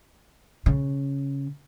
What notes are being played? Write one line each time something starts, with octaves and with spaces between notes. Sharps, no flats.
C#3